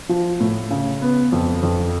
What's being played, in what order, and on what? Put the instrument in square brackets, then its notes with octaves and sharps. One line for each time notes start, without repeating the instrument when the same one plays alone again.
[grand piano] F3
A2
C#3
B3
F2
F2